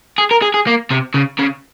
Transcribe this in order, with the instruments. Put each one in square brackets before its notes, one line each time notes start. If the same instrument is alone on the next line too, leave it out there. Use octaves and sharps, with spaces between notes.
[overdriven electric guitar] G#4
A#4
G#4
G#4
A#3
C3
C#3
C#3